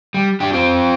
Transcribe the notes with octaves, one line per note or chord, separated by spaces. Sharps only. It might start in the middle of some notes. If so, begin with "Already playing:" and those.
G3
D4 G4
C4 F4